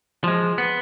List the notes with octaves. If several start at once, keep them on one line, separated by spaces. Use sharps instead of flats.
F3 G#3
B3